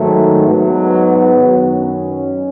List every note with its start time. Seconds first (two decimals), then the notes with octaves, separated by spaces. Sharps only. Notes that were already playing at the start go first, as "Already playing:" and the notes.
Already playing: G#2 D#3 F#3 A3
0.46 G#2 F#3 B3
1.33 F#2 D#3 F#3
1.78 C#4